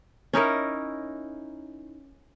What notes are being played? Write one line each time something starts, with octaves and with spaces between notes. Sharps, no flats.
C#4 D#4 E4 A#4